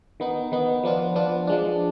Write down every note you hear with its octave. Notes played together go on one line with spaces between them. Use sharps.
D#3 B3 D#4
D#3 B3 D#4
F3 B3 D4 F4
F3 B3 D4 F4
F3 G#3 D4